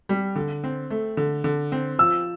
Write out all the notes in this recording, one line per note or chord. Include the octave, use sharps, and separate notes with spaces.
G3
D3
C4
A3
D3
D3
C4
F3 E6